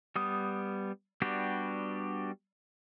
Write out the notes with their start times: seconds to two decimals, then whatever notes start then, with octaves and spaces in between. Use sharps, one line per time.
0.16 G3 B3 D#6
1.22 G3 B3 D4 F#4 G4